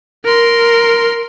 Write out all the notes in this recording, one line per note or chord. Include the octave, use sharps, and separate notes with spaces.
A#4 C6